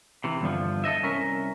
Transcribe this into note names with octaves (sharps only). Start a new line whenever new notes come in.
C3 E3
E2 G2 D3 F3
A4 C5 D#5 E5
C2 C#4 A#4 E5